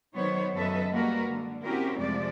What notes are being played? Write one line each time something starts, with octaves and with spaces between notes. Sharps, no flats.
D#3 F#3 B3 C5 C#5
F#2 C#3 A4 B4 D#5 E5
G3 G#3 A#3 F#4 A#4 B4
D3
C4 C#4 E4 F#4 G4 A#4
F2 C3 F3 G#3 A3 D5